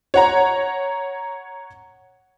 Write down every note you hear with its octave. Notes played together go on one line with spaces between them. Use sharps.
C#5 F#5 A#5